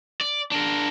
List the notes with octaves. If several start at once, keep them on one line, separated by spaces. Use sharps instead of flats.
D5
D4 A#4